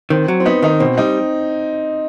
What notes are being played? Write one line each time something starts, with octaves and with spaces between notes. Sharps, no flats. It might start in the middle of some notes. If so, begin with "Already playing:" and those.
D#3 C4
F#3
C4
B3 D#4
D#3 D#4
B2 C4
G3 D#4